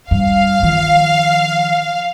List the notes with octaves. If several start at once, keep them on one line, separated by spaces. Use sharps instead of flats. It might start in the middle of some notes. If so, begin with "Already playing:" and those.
G2 F5
D#3 F3